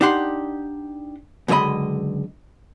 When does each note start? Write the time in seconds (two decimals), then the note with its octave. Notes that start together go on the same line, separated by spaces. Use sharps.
0.01 D4 D#4 G4 F#5 C6
1.48 C#2 F#2 D3 G#3 D#5 B5